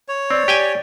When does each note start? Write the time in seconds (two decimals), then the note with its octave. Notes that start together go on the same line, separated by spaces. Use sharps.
0.08 C#5
0.30 C4 D5
0.48 G4 G5 G#5